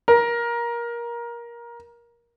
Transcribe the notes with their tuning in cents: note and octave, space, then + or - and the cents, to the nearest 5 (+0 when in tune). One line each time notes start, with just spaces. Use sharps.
A#4 +20